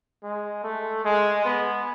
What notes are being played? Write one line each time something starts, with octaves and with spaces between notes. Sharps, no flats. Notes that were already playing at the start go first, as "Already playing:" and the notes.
G#3
A3
G#3
B3